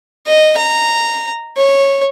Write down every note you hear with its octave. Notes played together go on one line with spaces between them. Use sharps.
D#5
A#5
C#5